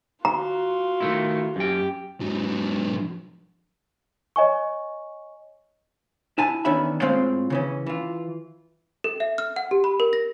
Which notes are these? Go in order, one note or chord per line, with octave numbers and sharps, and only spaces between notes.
F4 F#4 A#5
D#3 A3 E4
F#2 G4 G5
G#2 F#3
C#5 D#5 G#5 C#6
E4 G#5 A5
E2 D#3 C#4 D4 E5 B5
A2 G#3 C4 F4 F5
C#3 E3 C#4
E3 F4
A4
E5
F6
F#5
G4
B5
A#4
A#6